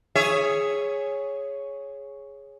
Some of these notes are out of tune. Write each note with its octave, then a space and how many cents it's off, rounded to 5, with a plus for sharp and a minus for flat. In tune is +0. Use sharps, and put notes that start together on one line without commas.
G#4 +0 C#5 +0 E5 +15